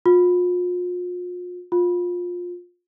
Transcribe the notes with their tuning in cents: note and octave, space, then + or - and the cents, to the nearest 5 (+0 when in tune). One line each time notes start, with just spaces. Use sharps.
F4 +40
F4 +20